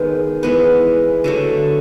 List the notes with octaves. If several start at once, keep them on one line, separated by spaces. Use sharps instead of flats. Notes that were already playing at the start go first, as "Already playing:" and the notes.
Already playing: D#3 G#3 B3
E3 G#3 B3 B4
D3 F#3 A3